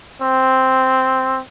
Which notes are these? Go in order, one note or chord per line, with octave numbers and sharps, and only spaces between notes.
C4